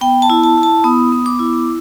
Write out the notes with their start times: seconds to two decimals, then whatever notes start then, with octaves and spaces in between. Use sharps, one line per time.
0.01 B3 G5
0.22 A5
0.30 E4
0.43 A5
0.57 E4
0.63 A5
0.84 B3 D#6
1.12 B3
1.26 D6
1.39 E4